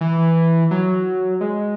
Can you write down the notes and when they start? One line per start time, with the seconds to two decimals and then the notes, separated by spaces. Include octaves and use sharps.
0.01 E3
0.71 F#3
1.41 G#3